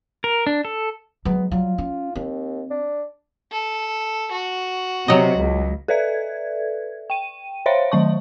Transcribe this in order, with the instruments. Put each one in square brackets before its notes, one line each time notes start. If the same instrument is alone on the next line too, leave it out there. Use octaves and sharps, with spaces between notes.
[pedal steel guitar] A#4
D4
A4
[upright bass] F#3 G#3 [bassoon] B3
[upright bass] F#3 G3 [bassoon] F4
[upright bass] C#4
[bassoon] D#2 [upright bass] C4
[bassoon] D4
[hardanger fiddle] A4
F#4
[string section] C3 [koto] F#3 D#5
[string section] C#2
[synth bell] A4 B4 D5 E5 G#6
G5 D#7
C5 C#5 E5 F5 C6
D#3 F#3 A5 C#6